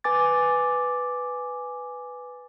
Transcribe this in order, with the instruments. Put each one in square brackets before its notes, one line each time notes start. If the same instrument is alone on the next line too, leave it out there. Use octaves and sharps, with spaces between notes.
[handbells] B4 G#5 D6 A6